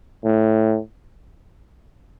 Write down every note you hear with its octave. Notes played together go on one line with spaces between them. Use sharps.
A2